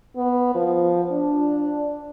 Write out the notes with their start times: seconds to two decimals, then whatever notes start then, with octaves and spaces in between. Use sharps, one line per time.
0.16 B3
0.55 F3
1.11 D4